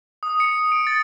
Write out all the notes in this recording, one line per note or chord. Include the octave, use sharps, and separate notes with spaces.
D#6
C#7
D7
A6